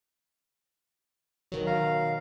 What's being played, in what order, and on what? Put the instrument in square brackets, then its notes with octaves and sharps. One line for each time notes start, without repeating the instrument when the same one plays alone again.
[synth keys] B2 D#3 F#3
[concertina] F5 A#5